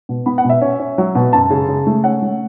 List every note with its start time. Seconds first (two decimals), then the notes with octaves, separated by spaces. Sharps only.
0.09 B2
0.26 B3 B5
0.38 F#5
0.45 B2
0.50 E5
0.62 C#4
0.80 C#4
0.98 F#3
1.15 B2
1.33 F#2 A5
1.50 C#3
1.68 C#3
1.87 A3
2.04 C#4 F#5
2.22 A3